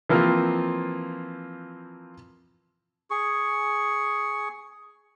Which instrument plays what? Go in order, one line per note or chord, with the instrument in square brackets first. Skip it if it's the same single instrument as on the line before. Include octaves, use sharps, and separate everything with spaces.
[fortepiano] E3 F3 A#3 C4 F4
[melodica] G#4 C#6